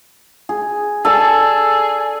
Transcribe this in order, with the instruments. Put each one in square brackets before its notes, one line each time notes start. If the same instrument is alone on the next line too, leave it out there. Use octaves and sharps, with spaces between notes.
[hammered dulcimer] G#4
[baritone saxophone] G#4 [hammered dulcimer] A4 D5 A5